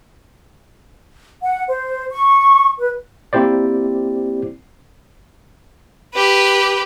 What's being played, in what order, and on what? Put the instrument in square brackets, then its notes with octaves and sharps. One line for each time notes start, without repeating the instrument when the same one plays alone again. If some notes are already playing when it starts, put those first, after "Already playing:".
[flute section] F#5
C5
C#6
B4
[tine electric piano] A#3 C4 E4 G4 C5 D5
[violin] G4 B4